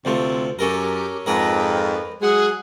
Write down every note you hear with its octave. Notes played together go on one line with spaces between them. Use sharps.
D2 C3 F3 A3
F#2 C#4 G4 A4 A#4
F2 G#2 A#4 B4 G5 A#5
F#3 G#3 G#4 F#5